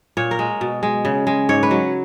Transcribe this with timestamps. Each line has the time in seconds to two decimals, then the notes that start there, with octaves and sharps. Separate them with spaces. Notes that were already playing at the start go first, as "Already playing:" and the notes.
0.17 A#2 C#5
0.31 A#4
0.39 G#3
0.61 B2
0.83 G#3
1.05 C#3
1.27 G#3
1.49 G#2 C#5
1.63 B4
1.71 F#3